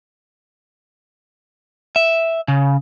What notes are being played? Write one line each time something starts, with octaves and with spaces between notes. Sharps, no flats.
E5
C#3